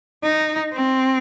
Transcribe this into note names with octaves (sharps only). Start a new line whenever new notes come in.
D#4
C4